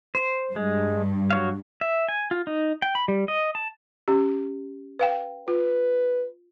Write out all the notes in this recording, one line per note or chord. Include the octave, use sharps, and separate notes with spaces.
C5
G2 G#3
F#3 C#5 F5
E5
G#5
F4
D#4
G5
B5
G3
D#5
A5
C#4 G4
B4 F5 G5
F4 B4